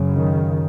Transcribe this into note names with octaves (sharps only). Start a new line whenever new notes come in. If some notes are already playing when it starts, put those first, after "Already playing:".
Already playing: F#2 C#3
D#3